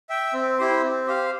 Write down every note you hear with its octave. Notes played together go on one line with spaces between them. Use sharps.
E5 G5
C4
E4 G4 C5
C4
G4 C5 F5